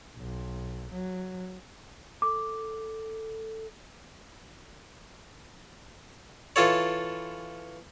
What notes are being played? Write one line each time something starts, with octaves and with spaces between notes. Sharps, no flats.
B1
F#3
A4 D6
E3 F4 A4 C#5